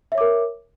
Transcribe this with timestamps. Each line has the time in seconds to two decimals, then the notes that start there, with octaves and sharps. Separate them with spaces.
0.12 E5
0.15 C#5
0.18 D6
0.21 A#4